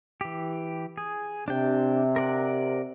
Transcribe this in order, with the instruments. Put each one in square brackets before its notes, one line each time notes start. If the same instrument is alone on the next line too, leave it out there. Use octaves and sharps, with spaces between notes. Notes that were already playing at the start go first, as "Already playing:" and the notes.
[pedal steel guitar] E3 G4
G#4
[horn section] C3 [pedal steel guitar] D4 G5
[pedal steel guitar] A#4 D5 F#5